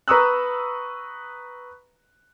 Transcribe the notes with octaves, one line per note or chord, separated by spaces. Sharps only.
B4 A#5 C#6 D#6 E6 F#6